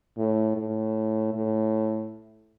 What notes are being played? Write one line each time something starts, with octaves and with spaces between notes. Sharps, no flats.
A2
A2
A2